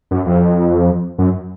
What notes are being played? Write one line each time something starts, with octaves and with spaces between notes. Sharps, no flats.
F#2
F2
F#2